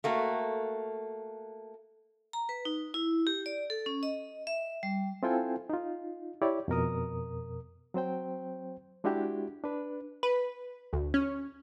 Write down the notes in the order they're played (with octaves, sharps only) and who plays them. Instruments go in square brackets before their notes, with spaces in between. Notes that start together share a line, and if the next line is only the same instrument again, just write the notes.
[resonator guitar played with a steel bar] A3 A#3 F#4
[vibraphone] A#5
B4
D#4
E4
G4
D5
A4
C#4
D#5
E5
G3
[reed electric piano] C4 E4 F4 A4 G5 G#5
D#4 F4
E4 G4 C#5 D5
F2 B2 A#4 D#6
F#3 C4 C5 G5
G#3 D4 E4 F#4 G4
D4 B4
[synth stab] B4
D2
C#4